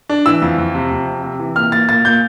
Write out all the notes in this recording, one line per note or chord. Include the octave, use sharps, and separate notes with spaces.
D4
E3 E6
F2
F2
C3
F2
C3
C3
E3
A#2 F6
A#2 A6
A#2 A6
A#2 G6